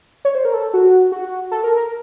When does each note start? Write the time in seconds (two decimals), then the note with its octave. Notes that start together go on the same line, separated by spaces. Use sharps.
0.25 C#5
0.35 C5
0.45 A#4
0.54 A4
0.74 F#4
1.12 F#4
1.51 A4
1.64 A#4
1.77 A#4